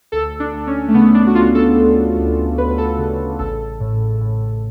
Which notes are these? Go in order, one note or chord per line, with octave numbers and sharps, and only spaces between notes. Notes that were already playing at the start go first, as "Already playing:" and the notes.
D2 A4
D4
D2
C#4
A3
C#3 B3
D4
F#4
D2 F4
A4
D2
D2
D2 B4
A4
C#3
A1 A4
A2
A2